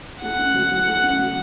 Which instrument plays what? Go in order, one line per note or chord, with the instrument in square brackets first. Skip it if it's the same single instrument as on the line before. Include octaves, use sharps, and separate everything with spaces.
[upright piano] A3 [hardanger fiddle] F#5
[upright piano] C#4
F#3
F#4
A3
C#4
F#3